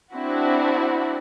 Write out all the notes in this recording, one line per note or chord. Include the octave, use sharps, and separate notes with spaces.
C4 D4 E4 F#4